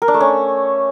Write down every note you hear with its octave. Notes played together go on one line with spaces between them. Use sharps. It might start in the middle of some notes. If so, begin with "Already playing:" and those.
A#4
D4
A3
C#4